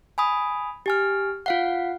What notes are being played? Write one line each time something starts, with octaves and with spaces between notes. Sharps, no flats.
G#5 B5 D#6
G4 G#5 F6
F4 F5 F#5